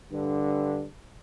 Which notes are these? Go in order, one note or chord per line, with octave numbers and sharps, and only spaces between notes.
G2 D3